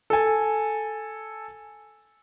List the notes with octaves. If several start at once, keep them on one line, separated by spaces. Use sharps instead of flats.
A4 G#5